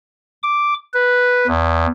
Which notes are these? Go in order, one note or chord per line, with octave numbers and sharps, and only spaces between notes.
D6
B4
E2